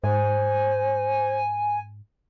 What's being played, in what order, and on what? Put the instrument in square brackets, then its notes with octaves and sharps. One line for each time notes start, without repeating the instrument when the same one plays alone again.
[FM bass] G#2 [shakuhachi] C5 [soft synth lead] G#5